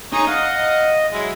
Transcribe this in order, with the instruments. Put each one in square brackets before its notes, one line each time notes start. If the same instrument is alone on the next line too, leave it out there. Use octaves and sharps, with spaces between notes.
[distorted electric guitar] D#4 [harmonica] G#4 C#5 D#5
[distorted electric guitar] D#5 [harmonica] F5 F#5
[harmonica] F#3 G#3 E4